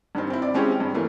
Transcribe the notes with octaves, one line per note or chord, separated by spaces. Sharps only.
G2 D#3 C4
C4 E4
D5
G#3 C4 C#4 E4 G4 C#5
G2
E3 A3 A#3